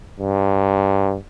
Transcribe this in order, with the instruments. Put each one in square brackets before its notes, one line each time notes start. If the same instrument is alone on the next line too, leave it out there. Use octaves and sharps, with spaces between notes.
[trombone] G2